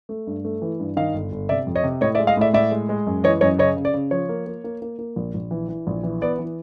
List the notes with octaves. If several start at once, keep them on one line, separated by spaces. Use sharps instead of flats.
A3
G2
A3
E3
G2
D#3 D#5 F5
G1
G1
C3 D5 E5
F2
C#5 D#5
C3
A2 C#5 D#5
D5 E5
G#3
D#5 F5
A2 D5 E5
A2 D5 E5
G#3
G#3
F#2
E3 C#5 D#5
F#2 C#5 D#5
C#3 C#5 D#5
C#3
D5
C#3
F3 C#5
A#3
A#3
A#3
A#3
A#3
A#1
A#1
E3
E3
A#1
E3
B3 D5
E3